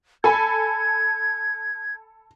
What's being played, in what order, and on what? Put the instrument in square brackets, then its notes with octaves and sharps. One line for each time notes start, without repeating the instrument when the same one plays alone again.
[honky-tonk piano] A4 G#5 B5 [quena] G#6